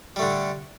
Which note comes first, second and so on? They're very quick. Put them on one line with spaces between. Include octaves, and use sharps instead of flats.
G3 A3 D3